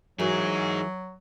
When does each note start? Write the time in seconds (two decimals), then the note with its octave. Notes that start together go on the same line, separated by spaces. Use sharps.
0.19 E3 F#3 D#4 F#4 G#4 A#4